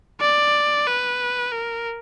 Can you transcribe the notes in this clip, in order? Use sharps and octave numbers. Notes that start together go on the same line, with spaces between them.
D5
B4
A#4